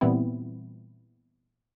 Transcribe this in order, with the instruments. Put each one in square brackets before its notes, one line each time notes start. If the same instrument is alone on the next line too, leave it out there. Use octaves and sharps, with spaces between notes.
[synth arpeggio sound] A#2 E3 G3 B3 C4 E4